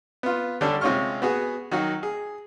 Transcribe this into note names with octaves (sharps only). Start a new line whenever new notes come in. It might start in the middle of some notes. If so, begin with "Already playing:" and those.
B3 F4
D3 G3 C#4 D4 A4
C3 G#3 C#4 F4 C#6 F6
B3 F#4 G#4
D#3 F#3 F#4
G#4